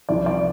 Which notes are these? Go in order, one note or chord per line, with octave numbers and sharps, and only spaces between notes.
C2 C3 F3 D5
D5